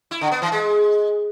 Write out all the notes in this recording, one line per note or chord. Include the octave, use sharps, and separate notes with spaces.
E4
D3
B3
E3
G#3